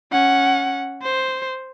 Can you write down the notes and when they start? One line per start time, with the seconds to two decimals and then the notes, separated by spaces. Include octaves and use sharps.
0.12 C#4 F#5
1.02 C5